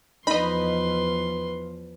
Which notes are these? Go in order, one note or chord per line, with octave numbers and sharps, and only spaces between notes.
E2 F3 D#4 B4 D#5 B5 C6